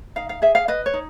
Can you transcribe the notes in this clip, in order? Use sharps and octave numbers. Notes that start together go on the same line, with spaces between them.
D#4 F5
F5
G#4 E5
F5
B4 D#5
C#5
D#4